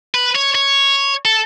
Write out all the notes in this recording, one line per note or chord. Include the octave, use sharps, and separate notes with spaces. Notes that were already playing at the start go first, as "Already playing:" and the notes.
B4
C#5
C#5
A4